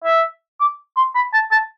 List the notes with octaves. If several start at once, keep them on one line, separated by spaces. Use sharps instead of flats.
E5
D6
C6
B5
A5
A5